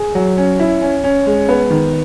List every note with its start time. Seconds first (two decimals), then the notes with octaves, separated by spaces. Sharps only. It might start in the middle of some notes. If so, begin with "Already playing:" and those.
Already playing: G#4
0.15 F#3
0.37 C#4
0.59 E4
0.81 C#4
1.04 C#4
1.26 G#3
1.49 B3
1.70 D#3